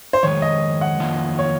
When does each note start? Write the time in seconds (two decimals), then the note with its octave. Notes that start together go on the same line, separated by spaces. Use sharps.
0.13 C5
0.23 F2 D#3 G#3 C#5
0.42 D#5
0.81 F#5
1.00 F2 D#3 A#3 F4
1.39 C#5